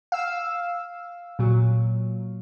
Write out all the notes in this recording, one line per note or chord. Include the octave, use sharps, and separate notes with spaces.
F5 E6
A#2 F#3